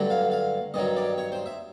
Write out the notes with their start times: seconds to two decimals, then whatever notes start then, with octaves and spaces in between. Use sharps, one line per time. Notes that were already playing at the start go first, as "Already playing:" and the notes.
Already playing: G2 D3 F#3 A3
0.10 F5
0.31 F5
0.74 G2 D#3 F#3 D#5
0.97 D5
1.18 C#5
1.32 C5
1.46 E5